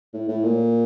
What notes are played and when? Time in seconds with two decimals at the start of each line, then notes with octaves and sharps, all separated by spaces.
0.13 A2
0.28 A2
0.44 A#2